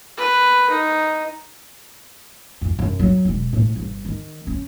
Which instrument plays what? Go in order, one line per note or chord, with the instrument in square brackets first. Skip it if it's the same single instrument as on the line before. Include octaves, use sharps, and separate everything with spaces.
[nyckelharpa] B4
D#4
[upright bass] F2
F#2
F#3
E1
A2
G1
D#3
C#4